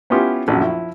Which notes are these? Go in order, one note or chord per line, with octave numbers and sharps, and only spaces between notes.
B3 C#4 E4 F4 G4
A#1 F#2
F3 E4